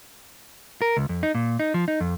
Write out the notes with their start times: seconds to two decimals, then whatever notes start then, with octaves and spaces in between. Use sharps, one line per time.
0.82 A#4
0.97 C#2
1.09 F2
1.23 D#4
1.35 A#2
1.60 D#4
1.74 F3
1.88 D#4
2.01 F2